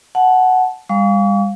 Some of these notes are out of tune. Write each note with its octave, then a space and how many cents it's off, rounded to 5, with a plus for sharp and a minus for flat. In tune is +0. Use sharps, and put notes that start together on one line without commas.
F#5 +0 A5 -25
G3 +40 F5 +10 C#6 +45